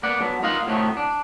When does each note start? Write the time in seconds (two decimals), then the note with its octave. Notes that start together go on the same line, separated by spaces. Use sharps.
0.03 A#3 B3 D5 F#5
0.19 D3 F#3 B3
0.42 A#3 D#4 F4 D#5 F5 F#5
0.67 A2 C3 D#3 F#3 A3 B3
0.97 D4